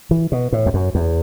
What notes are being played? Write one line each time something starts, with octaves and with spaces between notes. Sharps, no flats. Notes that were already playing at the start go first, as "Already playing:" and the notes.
E3
B2
A2
E2
F#2
E2